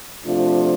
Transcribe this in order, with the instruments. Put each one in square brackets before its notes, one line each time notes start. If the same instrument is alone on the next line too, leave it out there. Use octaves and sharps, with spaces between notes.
[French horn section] C3 F3 A3 D4 F4